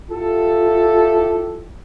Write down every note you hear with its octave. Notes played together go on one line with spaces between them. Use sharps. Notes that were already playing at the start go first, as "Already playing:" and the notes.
E4 F4 G4 A4